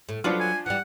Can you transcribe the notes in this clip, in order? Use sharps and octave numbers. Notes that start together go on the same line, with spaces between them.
A2
F3 F#3 D4 F4 B4
G#5
E3 G3 F#5